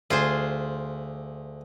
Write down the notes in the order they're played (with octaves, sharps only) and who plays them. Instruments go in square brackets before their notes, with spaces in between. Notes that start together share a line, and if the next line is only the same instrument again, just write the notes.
[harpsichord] D2 [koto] F4 G#4 C5